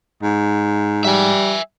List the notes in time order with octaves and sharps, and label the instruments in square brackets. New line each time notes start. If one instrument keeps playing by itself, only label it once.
[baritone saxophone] G#2
[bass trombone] G3 [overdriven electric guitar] E5 G#5